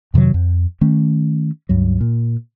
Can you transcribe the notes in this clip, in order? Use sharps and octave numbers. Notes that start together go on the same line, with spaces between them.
F2 C3 D#3 F#3
F2
D#3 A3 C#4
C#2 G2 F#3
A#2